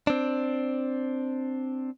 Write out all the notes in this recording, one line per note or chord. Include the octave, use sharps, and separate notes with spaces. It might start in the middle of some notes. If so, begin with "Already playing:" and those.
C4 D4